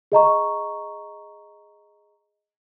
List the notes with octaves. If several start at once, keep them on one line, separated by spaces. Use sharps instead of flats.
G#4 D#5 A#5 C#6